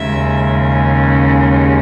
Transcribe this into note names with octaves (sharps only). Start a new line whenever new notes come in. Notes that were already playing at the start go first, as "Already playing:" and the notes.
Already playing: D#2 C#3 G#3 E5